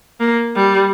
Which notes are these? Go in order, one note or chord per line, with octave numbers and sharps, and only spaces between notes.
A#3
G3